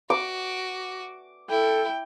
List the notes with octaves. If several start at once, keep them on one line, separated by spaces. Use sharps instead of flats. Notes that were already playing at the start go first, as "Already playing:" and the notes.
F#4 D6
E4 A4 G5